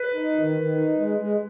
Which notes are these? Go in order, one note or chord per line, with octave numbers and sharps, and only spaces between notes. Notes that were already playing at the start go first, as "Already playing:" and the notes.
Already playing: B4
D#4
D#3
D#3
D#4
G#3
G#3